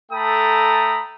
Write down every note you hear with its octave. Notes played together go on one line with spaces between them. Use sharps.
A3 A4 G5 A#5 B5 D#6